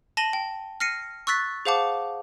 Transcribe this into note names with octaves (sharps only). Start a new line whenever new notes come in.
A5 A#6 D#7 F#7 G7
G5
F6 A#6 C7 C#7 D#7
C#6 E6 F#6 A6 B6
G#4 C5 F5 F#5 A5 D6